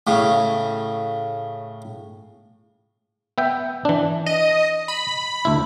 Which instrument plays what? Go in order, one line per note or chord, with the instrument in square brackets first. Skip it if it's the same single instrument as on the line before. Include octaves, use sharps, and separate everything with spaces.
[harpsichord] A2 C#3
[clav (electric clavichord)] B3 E5 G5
E3 D4
[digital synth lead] D#5
B5
[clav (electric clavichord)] D2 E4